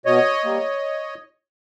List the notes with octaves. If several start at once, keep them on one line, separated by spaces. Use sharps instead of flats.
B2 C#5 D#5
G3 A#3